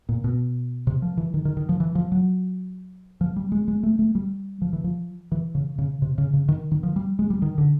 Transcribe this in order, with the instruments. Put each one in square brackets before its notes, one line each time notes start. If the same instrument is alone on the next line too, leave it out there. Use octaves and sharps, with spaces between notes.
[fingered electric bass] A#2
B2
C3
F3
E3
D#3
D#3
D#3
F3
E3
F3
F#3
F3
G3
G#3
G#3
A3
A3
G3
F3
E3
F3
E3
C#3
C#3
C3
C#3
C#3
D#3
D#3
F3
G3
G#3
G3
D#3
D3